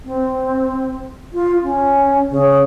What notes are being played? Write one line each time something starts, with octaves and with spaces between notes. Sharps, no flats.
C4
F4
C#4
C#3